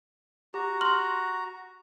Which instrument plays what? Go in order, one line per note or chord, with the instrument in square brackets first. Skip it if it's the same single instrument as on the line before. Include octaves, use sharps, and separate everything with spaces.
[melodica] F#4 A#5 [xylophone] G4
[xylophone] C6 F6 F#7